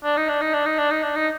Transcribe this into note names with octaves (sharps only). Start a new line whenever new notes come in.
D4
D#4
D4
D#4
D4
D#4
D4
D#4
D4
D#4